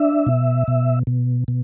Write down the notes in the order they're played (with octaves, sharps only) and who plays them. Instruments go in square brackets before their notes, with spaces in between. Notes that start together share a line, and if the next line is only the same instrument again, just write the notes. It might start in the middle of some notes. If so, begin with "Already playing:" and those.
Already playing: [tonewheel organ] D4 E5
B2
B2
B2
B2